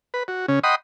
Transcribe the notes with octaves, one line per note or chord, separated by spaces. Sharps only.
B4
F#4
C#3 C#4
D#5 F#5 G5 B5 C6 D#6